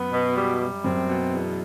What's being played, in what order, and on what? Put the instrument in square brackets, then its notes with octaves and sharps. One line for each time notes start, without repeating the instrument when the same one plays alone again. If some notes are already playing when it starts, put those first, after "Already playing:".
Already playing: [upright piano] F#2 [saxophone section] B3
[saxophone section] B2
G3
G3
[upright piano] F#2 [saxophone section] C4
[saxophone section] B2
E2